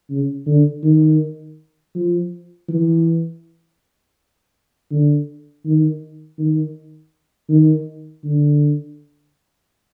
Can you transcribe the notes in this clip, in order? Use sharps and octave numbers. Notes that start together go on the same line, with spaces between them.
C#3
D3
D#3
F3
E3
D3
D#3
D#3
D#3
D3